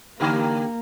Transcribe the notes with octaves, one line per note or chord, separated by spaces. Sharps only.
D3 A#3 G4 A#4